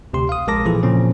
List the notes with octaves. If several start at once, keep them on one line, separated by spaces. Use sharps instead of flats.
D2 C3 G4 C6
F5 D#6
A#1 G#3 A#4 A5 D6 A#6
A#2 E3 F3 E4 G#4 A4
A#2 C#3 F3 C4 C#4